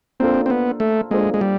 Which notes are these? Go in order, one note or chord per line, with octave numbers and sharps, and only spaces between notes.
A#3 C4 D4 F4 A4 C5
C4
B3
A3
G#3 A#3 D4 F4 A4 C5
G#3
G3